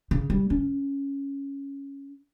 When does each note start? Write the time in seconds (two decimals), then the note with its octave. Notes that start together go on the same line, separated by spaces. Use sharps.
0.11 C#3
0.30 G3
0.50 C#4